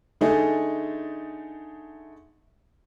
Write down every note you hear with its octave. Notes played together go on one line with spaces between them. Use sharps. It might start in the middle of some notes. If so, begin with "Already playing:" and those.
D3 A3 D#4 G#4